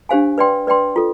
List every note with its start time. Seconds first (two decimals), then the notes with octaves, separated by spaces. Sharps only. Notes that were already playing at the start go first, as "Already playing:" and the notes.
0.09 D4 G4 C5 F5 G#5
0.38 B4 D5 G5 C6
0.67 B4 D5 G5 C6
0.96 F4 A4